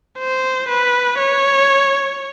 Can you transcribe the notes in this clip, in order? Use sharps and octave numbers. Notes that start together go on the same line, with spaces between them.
C5
B4
C#5